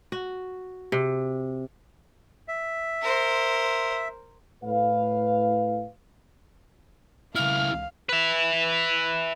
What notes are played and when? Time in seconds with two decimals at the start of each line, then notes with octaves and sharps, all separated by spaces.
0.12 F#4
0.92 C3
2.48 E5
3.02 A#4 C5
4.64 A2 B4 F5
7.35 C#2 E4 F5 F6
8.09 B4 E5